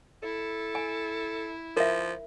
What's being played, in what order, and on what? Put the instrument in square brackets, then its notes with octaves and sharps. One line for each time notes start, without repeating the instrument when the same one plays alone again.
[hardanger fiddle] E4 [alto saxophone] A4
[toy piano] G#5
[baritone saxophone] F3 [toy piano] A#4 E5